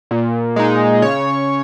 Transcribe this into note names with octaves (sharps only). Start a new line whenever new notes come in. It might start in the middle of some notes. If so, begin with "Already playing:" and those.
A#2
G#3 D#4
C#3 C#5